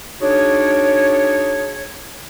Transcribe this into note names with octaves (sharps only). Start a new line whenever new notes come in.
D4 D#4 F#4 G#4 C#5